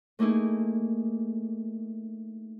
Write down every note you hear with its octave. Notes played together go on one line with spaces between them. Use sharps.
A3 A#3 D#4 E4 G#4